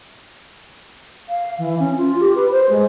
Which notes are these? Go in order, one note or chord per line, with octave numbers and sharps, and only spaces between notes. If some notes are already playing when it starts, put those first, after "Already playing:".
F5
E3
C#4
F4
G4
B4
C5
G#3